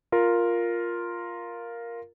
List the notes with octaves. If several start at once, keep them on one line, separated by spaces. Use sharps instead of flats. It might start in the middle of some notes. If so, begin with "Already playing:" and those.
F4 A#4